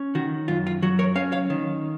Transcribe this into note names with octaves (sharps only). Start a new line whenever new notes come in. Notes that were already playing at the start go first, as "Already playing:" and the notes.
Already playing: C#4
D#3 F#4
F#2 F4
F4
F#3 F#4
A#4 C#5
C#4 C#5 F5
C#5 F5
D#3